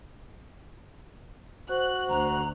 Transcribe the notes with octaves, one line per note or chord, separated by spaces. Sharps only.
F#4 C5 F#6
D2 A#5 F#6